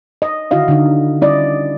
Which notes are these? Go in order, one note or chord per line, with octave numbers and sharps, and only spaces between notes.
D#5
D3 D#3 E4 F#4 D#5 F5
D3 D#4
G3 C#4 E4 D5 D#5